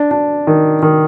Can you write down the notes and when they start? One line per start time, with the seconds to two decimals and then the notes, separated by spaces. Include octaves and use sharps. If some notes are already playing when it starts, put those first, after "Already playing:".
Already playing: D4
0.11 D4
0.47 D#3
0.82 D#3